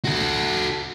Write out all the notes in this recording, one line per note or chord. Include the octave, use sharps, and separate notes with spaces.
F#4 A4